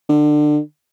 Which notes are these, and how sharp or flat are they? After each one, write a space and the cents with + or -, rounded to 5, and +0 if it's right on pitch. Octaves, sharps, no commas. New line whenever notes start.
D3 +25